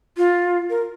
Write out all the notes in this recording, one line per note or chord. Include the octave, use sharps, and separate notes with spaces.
F4
A#4